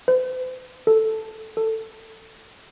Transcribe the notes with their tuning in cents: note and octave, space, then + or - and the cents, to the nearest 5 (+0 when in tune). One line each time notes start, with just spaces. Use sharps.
C5 -45
A4 +0
A4 +15